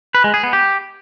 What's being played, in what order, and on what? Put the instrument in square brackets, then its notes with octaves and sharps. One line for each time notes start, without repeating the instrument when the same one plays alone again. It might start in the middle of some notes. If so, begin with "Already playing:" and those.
[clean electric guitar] B4
G#3
G#4
B3
G4